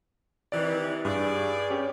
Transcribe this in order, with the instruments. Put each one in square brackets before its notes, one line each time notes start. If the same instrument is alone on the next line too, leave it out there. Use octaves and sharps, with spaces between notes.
[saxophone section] C3 D#3 E3 [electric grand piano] D5
[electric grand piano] G2 [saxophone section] G#4 D5
[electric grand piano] C#4 G4 C#5